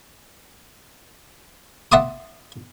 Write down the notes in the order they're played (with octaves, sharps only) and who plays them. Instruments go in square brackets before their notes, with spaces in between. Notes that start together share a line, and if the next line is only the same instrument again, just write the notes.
[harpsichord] E5 F#5 A5 C6 D6 D#6